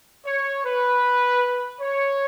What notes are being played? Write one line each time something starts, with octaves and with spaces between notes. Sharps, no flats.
C#5
B4
C#5